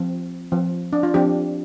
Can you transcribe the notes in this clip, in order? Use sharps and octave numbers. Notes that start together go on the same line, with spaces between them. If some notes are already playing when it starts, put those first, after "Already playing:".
Already playing: F3 C4
F3 C4
D4
F4
F3 C4 D4 G4